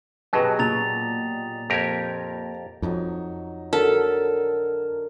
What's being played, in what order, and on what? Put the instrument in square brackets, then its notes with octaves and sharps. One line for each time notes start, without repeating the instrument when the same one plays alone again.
[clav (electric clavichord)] B2 F#3 [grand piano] G4 G#4 D#5 [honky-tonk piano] B4 A5
[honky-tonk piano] A#2 [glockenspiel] A#5 A6 F7
[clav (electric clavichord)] F2 G4 A#4 [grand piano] G#6 A#6
[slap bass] F2 [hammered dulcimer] F#3 D#4 C#6
[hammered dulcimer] D3 F#3 [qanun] A4 [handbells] A#4